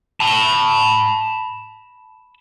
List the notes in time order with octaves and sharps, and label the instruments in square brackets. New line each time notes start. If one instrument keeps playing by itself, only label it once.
[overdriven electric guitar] A5 B5